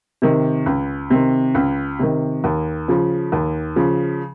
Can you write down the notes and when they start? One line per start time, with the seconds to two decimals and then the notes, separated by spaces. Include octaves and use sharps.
0.22 C3 D#3
0.66 C#2
1.10 C3 D#3
1.54 C#2
1.99 C3 D#3
2.44 D#2
2.88 C#3 F3
3.32 D#2
3.76 C#3 F3